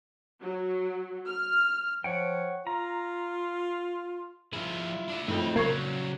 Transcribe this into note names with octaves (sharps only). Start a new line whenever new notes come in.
F#3
F6
F3 C#5 F#5 G5
F4 A#5
F3 E4 F4 G#4
D4 E5
F2 A2 D#4 G#4 B5
C#3 F#3 G3 A#3 C#6 G#6 C7